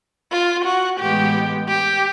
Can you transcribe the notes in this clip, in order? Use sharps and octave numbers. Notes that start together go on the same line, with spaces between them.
F4
F#4
A2 E3 G#3 B3 G4
G4